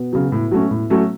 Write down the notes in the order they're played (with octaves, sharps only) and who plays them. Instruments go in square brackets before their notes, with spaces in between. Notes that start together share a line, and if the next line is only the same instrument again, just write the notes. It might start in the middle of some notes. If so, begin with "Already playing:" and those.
Already playing: [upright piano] B2 B3
[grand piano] C#3 F#3
A2
F#3 A3 C#4
A2
F#3 A3 C#4